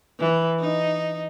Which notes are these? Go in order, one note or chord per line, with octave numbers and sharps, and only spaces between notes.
E3
D#4